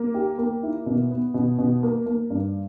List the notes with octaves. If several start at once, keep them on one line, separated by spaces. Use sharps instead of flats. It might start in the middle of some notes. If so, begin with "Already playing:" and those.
Already playing: A#3
G4
A#3
E4
B2
B3
B2
B2
A#3
A#3
G2